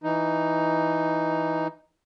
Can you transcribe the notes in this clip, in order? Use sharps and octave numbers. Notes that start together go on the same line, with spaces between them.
E3 D#4